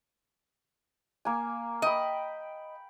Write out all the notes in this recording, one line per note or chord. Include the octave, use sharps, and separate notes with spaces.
A#3 G#5
D#5 G5 B5